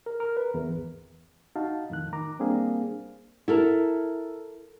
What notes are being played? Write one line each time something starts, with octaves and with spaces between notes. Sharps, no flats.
A#4
A#4
B4
E2
G#1
D#4 F#4 F5 A5
F2 A2 D#3 F#6
D#3 A#5 D6
G3 A#3 C4 D4 G#4 F5
E4 A4 A#4